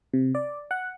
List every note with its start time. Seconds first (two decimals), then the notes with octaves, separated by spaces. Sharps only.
0.14 C3
0.35 D5
0.71 F#5